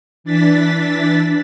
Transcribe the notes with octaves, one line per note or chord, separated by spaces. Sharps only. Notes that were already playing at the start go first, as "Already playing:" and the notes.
E3 D4 A6 B6